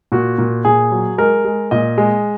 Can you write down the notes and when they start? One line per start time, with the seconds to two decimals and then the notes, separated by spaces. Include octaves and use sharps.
0.12 A#2 F#4
0.38 A#2
0.65 A#2 G#4
0.91 F#3
1.18 G#3 A#4
1.45 G#3
1.71 A#2 D#5
1.98 G#3